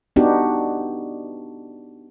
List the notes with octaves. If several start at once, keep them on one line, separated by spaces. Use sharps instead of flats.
B3 D4 D#4 F#4 G4